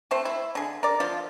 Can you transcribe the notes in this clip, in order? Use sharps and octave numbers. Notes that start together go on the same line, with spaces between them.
C3 A3 C5
E4
D3 G#4
A#4 D5
D3 F3 F4